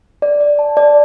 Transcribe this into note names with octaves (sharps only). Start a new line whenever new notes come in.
D5
D5
A5
D5